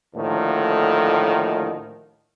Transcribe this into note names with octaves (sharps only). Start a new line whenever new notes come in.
D#2 A2 D3 D#3 F3